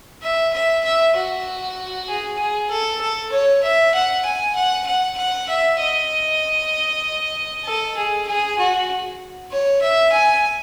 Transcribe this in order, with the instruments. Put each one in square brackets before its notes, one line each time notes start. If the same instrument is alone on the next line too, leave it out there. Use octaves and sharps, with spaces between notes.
[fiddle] E5
E5
E5
F#4
G#4
G#4
A4
A4
C#5
E5
F#5
G#5
F#5
F#5
F#5
E5
D#5
A4
G#4
G#4
F#4
C#5
E5
G#5